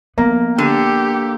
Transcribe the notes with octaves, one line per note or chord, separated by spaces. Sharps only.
A#3 B3
D3 G4